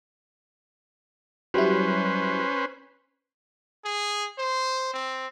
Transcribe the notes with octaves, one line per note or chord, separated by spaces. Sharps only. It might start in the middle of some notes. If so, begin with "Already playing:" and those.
F#3 G3 C#4 E4 B4 C5
G#4
C5
C4